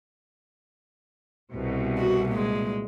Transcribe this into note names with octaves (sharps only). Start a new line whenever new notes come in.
C2 B2
F#4
A#2 G#3